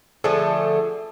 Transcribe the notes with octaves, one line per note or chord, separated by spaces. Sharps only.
D3 F3 A3 G#4 A4